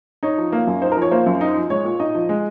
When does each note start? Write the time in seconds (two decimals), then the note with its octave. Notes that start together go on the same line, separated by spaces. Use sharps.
0.23 D#4 C#5
0.38 F3
0.52 A#3
0.67 F#2
0.82 D#4 C5
0.92 A#4
0.97 F3
1.02 C#5
1.11 A#3 C5
1.26 F#2
1.41 D#4
1.56 F3
1.70 G#3 C#5
1.85 A#2
2.00 D#4 D#5
2.15 F3
2.29 G#3